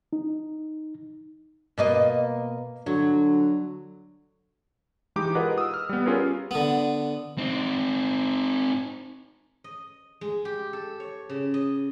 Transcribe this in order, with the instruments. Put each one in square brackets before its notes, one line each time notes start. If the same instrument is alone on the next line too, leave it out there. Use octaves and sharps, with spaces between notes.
[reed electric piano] D#4
[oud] B2 A#3 D#5
[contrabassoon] D3 [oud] F#3
[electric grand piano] E3 G#3 D#4 G4 D6
F4 G#4 A#4 B4 D#5 F#5
D#6 E6
F6
G3 B3
C#4 F4 G4 G#4 A#4 B4
[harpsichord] D3 B3
[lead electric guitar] C4 D#4
[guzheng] D#5
G#3
G4
A4
C#5
C#3
D#5